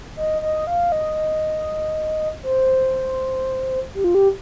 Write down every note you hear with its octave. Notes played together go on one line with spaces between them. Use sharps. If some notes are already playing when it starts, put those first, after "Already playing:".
D#5
D#5
F5
D#5
C5
G4
F4
G4